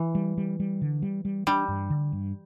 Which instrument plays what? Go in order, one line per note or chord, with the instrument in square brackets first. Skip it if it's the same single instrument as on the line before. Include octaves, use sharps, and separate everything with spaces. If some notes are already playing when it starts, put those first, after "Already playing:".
Already playing: [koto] E3
[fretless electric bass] G3
G3
G3
D3
G3
G3
[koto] G3 [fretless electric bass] D4
[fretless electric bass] G2
D3
G2